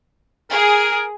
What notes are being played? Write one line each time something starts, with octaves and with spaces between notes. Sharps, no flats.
G#4 A#4